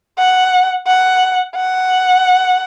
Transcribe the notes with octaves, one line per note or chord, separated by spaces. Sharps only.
F#5
F#5
F#5